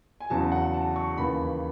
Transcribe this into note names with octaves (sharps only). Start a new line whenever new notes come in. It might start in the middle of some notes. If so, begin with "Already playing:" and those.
G#5
E2 C#3 F#3 A5
F#5
A5
C#6
D#2 C#3 E3 B5